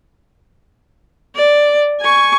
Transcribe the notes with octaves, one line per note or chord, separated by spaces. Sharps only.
D5
G#5 C#6